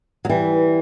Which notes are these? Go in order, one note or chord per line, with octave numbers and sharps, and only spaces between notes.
F#3
E3 G3